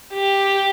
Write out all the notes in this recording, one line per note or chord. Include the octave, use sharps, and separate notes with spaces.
G4